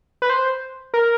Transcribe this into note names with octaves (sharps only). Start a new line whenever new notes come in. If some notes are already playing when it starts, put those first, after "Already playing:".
B4
C5
A#4